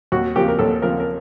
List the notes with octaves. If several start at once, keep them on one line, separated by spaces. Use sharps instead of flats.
D#2 F#4
C#3 F3 A#3 G4
A#4
D#2 A4
C#3 F3 A#3 A#4
A#4